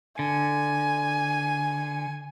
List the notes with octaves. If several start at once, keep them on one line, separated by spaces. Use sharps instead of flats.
D3 G#5